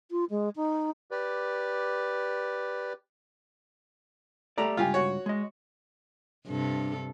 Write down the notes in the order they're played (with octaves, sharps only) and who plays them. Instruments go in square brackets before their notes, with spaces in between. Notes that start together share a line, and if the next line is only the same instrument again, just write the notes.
[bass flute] F4
G#3
D#4
[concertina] G4 B4 D5
[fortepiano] A3 A#5 [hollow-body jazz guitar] G4 D5
[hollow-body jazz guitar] C#2 G2 [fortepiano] F4 G4 G#5
[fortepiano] F#4 C#5
[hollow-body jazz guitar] G#3 D#5
[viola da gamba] G2 C3 A4